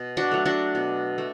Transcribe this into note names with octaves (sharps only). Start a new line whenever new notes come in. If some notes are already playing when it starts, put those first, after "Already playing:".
Already playing: B2
D4 F#4
F#3 A3
D4 F#4
B2
A3